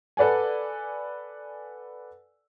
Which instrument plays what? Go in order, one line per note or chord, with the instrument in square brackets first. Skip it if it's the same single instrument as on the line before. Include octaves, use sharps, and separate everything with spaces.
[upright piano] A4 B4 D5 F#5 G#5